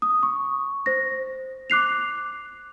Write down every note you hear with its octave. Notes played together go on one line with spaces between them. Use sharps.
D#6
C#6
C5 A#6
D6 F#6 C7 F7